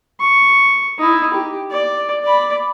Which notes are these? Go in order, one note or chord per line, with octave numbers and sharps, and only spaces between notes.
C#6
D#4 E4
G4
D5
D5 B5